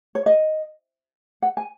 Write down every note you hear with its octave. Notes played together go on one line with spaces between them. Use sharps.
C#5
D#5
F#5
G#5